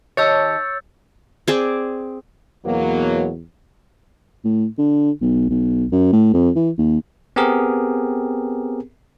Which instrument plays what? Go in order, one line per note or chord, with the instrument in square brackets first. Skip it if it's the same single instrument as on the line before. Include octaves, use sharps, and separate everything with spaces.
[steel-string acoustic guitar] D#3 G4 A5 [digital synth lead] C#5 [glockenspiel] E6 G6 A6
[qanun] C4 G#4 D5
[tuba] E2 [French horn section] B2 F#3 A#3
[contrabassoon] A2
D3
B1
B1
F#2
A2
F2
E3
D#2
[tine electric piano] B3 C4 G4 G#4 A#4